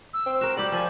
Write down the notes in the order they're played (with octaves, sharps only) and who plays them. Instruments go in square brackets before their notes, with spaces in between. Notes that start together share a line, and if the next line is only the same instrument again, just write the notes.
[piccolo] E6
[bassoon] C4
[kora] F#4 A#4 [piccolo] E7
[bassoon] G3 [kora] G4 D5 [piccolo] F#7
[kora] F3 [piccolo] G#5